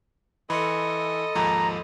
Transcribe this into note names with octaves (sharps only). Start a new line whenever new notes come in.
E3 A4 D#5 B5 C6 C#7
D#2 G#2 F3 A#5